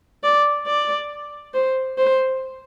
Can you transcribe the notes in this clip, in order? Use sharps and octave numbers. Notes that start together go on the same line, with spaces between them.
D5
D5
C5
C5